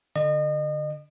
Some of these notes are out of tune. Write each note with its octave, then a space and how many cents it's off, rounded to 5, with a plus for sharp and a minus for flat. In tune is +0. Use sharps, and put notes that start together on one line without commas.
D3 +0 D#5 -35